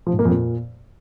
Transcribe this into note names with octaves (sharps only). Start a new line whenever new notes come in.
F3
G#2
A#3
F2
A#2